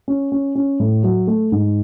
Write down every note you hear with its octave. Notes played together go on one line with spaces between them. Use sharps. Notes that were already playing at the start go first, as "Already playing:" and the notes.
C#4
C#4
C#4
A2
F#3
A3
G#2